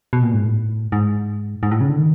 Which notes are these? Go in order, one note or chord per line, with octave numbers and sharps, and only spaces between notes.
B2
A#2
G#2
A2
G#2
G#2
A2
C#3
D3
D#3